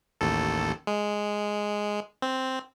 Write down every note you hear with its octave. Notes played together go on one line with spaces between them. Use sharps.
A1 D#2 A4
G#3
C4